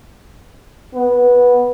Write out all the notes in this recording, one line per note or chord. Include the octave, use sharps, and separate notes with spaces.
B3